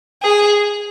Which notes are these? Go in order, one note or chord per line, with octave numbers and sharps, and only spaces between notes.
G#4